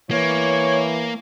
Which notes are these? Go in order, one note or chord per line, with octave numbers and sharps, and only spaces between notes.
E3 A#3 C#5